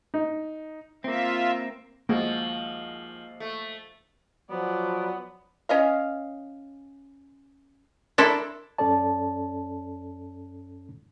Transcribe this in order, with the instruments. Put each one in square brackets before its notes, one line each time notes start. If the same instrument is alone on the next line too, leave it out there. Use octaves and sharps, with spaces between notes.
[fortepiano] D#4
[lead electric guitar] A#3 C4 [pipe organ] F4 E5
[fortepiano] D#2 G#3 F#4 [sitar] F3 [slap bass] A#3
[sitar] A3
[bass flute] F3 [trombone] F#3 [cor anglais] B3 [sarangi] D5
[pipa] C#4 D#5 F5
[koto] D4 E4 A4 [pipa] A#4 C6
[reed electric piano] F#2 C#4 A4 C#5 D5 A5